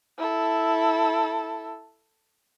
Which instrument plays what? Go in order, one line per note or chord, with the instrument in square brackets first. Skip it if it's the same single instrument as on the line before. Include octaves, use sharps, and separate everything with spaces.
[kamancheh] E4 A4